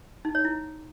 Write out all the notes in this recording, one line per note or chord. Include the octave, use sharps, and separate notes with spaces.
D#4
C#5
E4